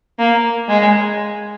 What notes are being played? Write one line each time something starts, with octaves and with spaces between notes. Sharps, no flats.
A#3
G#3